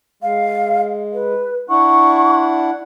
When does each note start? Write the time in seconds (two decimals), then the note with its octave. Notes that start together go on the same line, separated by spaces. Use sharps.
0.23 G#3 F5
1.14 B4
1.70 D4 E4 F#5 C#6